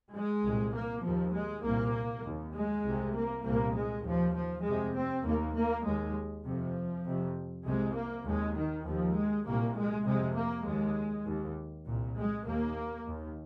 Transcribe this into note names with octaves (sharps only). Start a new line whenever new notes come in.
G#3
C2 A#2
A#3
D#2 F3
G#3
C2 A#2 A#3
D#2
G#3
C2 C3
A#3
C2 A#2 A#3
G#3
D#2 F3
F3
F2 C3 G#3
C4
D#2 A#3
A#3
D#2 G#3
F2 C3 F3
F2 C3
C2 C3 G#3
A#3
D#2 G#3
D#3
D#2 F3
G#3
C2 A#2 A#3
G#3
F2 C3 G#3
A#3
D#2 G#3
D#2
C2 A#2
G#3
D#2 A#3
D#2